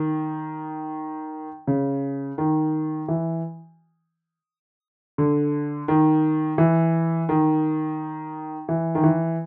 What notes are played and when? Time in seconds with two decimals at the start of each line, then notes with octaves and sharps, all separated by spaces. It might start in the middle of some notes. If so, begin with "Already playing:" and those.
Already playing: D#3
1.67 C#3
2.38 D#3
3.08 E3
5.18 D3
5.88 D#3
6.58 E3
7.29 D#3
8.69 E3
8.95 D#3
9.03 E3